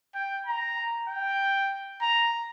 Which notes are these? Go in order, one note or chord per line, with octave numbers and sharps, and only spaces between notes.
G5
A#5
G5
A#5